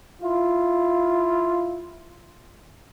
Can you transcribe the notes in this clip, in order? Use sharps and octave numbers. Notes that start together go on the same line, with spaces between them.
E4 F4